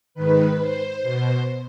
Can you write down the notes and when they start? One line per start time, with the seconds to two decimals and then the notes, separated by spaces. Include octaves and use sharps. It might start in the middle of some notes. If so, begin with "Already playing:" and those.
0.14 G#2 D#3 B4
0.59 C5
1.02 B2